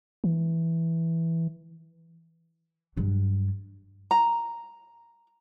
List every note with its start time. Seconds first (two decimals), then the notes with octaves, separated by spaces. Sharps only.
0.24 E3
2.97 G2 F#3
4.11 A#5